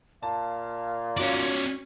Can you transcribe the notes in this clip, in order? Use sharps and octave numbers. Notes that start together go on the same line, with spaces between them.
A#2 F5 A5
C#4 F4 F#4 C#5 D5